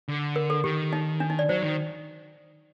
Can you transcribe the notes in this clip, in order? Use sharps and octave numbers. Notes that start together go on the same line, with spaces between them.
D3
A#4
A4
D#3 G4
D#4
D4
D#4
D5
F#3 C5
D#3